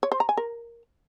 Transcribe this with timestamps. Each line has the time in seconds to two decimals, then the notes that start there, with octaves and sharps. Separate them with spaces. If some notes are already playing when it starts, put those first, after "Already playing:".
0.03 C#5
0.12 C5
0.20 A#5
0.29 G#5
0.37 A#4